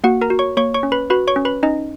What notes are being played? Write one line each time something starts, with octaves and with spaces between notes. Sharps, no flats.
A#3 F#4 F#5
A#4 A#5
F#4
C#5 C#6
A#3 C#5 C#6
C#5 C#6
C#4
B4 B5
F#4 B4 B5
C#5 C#6
C#4
B4 B5
C#4 D#4 D#5